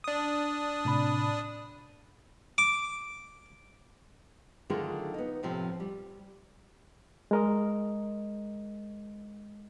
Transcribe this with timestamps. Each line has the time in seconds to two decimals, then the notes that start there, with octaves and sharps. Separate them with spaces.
0.04 D4 D#6
0.85 A2 C3 B5
2.58 D6
4.70 D3 D#3 F#3 A3 F4 G#4
5.14 B3 D#4
5.43 A2 C3 F3
5.80 G3
7.31 G#3 A#4 D#5